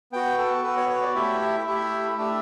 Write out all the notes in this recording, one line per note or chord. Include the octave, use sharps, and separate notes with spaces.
B3 F#4 G5
A4
B3 F#4 B4
C#5
C#5
D5
A3 E4 G4 E5
E5
A3 E4 G4 E5
A3 D4 G4 E5